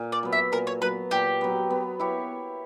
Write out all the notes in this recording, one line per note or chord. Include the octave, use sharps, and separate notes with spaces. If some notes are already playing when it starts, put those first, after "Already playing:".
Already playing: A#2
D5
F#3 B3
E5
A#2 A#4
C#5
F#3 B3 B4
A#2 G4
F#3 B3
B3
E4 G4 C#5